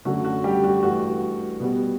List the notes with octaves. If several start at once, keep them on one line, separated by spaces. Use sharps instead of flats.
F#2 D3 F#3 A3 F#4
F#4
G3 G4
F#4
G2 E3 A3 F#4
B2 G3 B3